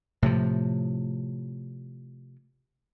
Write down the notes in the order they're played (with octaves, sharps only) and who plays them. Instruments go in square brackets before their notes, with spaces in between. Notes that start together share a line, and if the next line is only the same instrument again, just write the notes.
[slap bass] A2 C3 F3